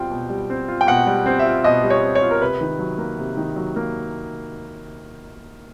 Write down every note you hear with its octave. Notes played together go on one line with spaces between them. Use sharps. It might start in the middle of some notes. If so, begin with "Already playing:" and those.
Already playing: B2 G3 C4 F4 G5
B2
G3
C4
F4
G5
B2 F#5
G3
C4
E5
F4
B2 D#5
G3
C#5
C4
C#5
F4
A#4
C3 B4
D#3
F#3
A#3
C3
D#3
F#3
A#3